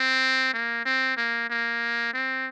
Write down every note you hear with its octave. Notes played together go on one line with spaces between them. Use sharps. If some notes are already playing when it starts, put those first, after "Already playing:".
Already playing: C4
A#3
C4
A#3
A#3
C4